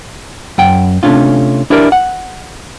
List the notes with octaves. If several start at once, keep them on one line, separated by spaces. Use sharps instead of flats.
F#2 F#5 G5
C3 A3 C#4 D4 F4
D4 E4 G4 A#4 C5 D5
F#5